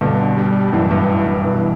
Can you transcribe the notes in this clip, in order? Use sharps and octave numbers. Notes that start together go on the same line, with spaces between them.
G2 B2 D3
G3
F#2 A2 E3
G2
G2
G2 B2